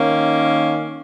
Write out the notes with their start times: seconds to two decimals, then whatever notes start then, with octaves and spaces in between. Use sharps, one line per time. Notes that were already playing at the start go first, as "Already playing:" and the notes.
Already playing: D#3 A#3 C#4